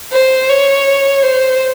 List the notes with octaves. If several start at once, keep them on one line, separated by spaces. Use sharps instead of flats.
C5
C#5
C5